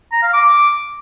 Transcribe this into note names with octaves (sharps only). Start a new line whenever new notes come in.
A#5
F5
D6